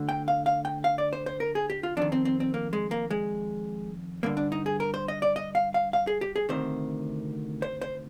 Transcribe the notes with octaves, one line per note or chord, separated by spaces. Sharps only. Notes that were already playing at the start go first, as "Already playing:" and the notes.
Already playing: D2 D3
G5
F5
F5
G5
F5
D5
C5
C5
A#4
G#4
G4
F4
F2 D#3 D4
C4
C4
C4
A#3
G#3
A#3
G#3
G2 D3 A#3
D4
D#4
G#4
A#4
C5
D#5
D5
D#5
F5
F5
F5
G#4
G4
G#4
D2 C3 D#3 C5
C5
C5